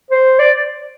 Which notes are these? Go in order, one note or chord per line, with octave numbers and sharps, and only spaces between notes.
C5
D5